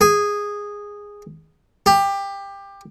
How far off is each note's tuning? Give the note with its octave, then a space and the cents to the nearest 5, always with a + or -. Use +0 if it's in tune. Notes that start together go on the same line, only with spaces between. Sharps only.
G#4 -10
G4 +20